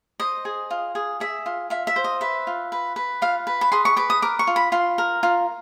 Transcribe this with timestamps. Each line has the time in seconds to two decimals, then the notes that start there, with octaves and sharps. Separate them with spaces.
0.20 C5 D#5
0.45 G#4
0.71 F4
0.95 G#4
1.20 G#4 E5
1.46 F4
1.70 F4 E5
1.87 E5
1.96 C5
2.04 D#5
2.21 B4 E5
2.47 F4
2.72 B4
2.96 B4
3.22 F4 F5
3.47 B4
3.61 B5
3.72 G#4 C6
3.85 C#6
3.97 B4 D6
4.10 D#6
4.22 A#4 D6
4.39 C#6
4.47 F4
4.56 B5
4.72 F4 C6
4.98 A#4
5.23 F4